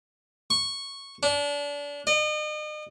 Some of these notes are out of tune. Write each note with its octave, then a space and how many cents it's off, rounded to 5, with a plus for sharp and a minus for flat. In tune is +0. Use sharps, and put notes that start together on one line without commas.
C#6 -15
D4 -30
D#5 -40